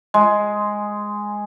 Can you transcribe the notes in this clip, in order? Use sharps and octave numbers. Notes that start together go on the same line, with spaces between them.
G#3